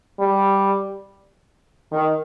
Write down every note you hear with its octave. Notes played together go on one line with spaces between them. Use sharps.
G3
D#3